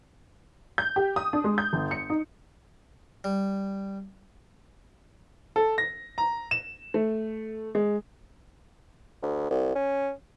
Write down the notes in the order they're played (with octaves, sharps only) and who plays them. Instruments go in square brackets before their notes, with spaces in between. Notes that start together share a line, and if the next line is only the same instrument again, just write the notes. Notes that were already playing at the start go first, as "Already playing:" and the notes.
[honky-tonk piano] G6
G4
D#6
D4
G#3
G6
G1
C#7
D#4
[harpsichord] G3
[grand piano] A4
A#6
A#5
E7
A3
G#3
[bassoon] D2
C2
C#4